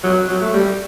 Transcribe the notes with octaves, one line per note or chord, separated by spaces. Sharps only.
F#3
F#3
A3
G3